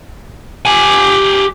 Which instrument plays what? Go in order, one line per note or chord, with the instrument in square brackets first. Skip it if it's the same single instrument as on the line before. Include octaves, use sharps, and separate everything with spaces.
[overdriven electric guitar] G4 G#5